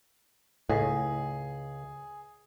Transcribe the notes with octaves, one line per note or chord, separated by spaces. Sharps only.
C#2 A2 G#4